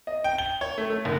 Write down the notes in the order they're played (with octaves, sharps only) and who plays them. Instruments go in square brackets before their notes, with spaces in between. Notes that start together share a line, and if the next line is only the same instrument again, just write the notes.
[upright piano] D#5
G5
G7
C#5
A3
A3
F#1